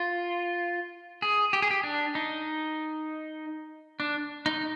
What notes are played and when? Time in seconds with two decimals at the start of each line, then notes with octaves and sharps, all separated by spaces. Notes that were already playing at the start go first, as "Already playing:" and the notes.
Already playing: F4
1.22 G#4
1.53 G4
1.62 G#4
1.70 G4
1.84 D4
2.15 D#4
4.00 D4
4.46 D#4